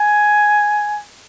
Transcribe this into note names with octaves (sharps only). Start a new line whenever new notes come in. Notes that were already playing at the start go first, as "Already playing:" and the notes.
Already playing: G#5